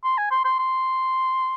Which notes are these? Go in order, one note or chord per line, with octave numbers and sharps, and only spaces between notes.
C6
G#5
C6
C6
C6